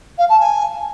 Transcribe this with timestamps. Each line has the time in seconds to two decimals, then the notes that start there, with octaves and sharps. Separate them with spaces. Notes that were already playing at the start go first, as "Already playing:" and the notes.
0.18 F5
0.29 A5
0.40 G#5